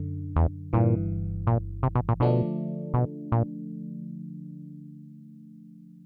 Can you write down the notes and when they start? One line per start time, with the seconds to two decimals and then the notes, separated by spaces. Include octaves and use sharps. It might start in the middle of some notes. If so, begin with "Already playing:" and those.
Already playing: F#2 D3
0.36 E2
0.73 G1 G2 A#2 E3
1.47 A#2
1.83 C3
1.95 B2
2.09 A#2
2.20 B2 D3 F3 A3 D4
2.94 B2
3.32 A#2